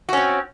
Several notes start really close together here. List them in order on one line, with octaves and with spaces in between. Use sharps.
F#4 C#4 C4